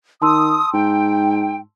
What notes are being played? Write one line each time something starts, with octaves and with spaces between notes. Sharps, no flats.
D#3 A5 C6 D#6 E6
G#2 G5